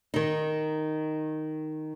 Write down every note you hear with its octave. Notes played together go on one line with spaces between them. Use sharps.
D#3 D#4